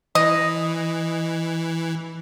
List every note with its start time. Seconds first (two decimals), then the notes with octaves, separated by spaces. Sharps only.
0.15 E3 D#5